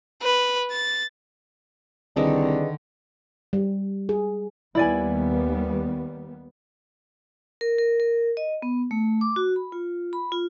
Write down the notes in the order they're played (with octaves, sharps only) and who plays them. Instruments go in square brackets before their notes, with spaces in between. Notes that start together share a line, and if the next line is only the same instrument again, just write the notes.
[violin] B4
A6
[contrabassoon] C2 [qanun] D3 D#3 [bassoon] D4 [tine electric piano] G#4 B4 D#5
[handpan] G3
G#4
[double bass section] D#2 G3 B3 [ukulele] E4 D5 G#5
[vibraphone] A#4
A#4
A#4
D#5
B3
A3
D6
F#4
B5
F4
B5
F4